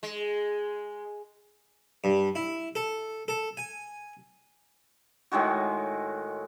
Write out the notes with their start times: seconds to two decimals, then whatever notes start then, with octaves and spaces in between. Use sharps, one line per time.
0.03 G#3
2.04 G2
2.35 E4
2.75 A4
3.28 A4
3.57 G#5
5.32 A2 D#3 G#3 F#4